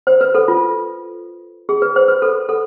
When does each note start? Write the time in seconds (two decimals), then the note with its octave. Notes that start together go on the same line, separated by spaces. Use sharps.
0.07 C5
0.21 B4
0.35 A4
0.48 F4
1.69 G#4
1.82 B4
1.96 C5
2.08 B4
2.22 A4
2.49 A4